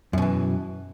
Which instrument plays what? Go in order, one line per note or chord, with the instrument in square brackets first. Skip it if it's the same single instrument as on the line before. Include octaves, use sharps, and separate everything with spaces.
[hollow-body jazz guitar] F#2
B2
E3